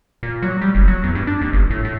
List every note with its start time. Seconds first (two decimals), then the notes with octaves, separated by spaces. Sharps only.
0.23 A#2
0.42 F#3
0.61 G3
0.75 F#1
0.88 F#3
1.03 E2
1.15 G2
1.27 D4
1.41 D#2
1.53 G1
1.70 A2
1.85 A2